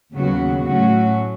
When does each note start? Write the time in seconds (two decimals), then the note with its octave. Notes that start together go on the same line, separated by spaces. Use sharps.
0.13 D#2 C#3 F#3 B3 F#4
0.66 A2 F#3 A3 C#4 F#4